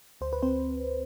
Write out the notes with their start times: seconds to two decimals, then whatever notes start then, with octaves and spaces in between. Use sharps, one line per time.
0.21 D2 C5
0.33 B4
0.42 C4 C5